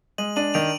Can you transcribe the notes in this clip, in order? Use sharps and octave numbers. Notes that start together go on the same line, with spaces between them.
G#3 D#7 F#7
D4 D#7 F#7
D#3 D7 F7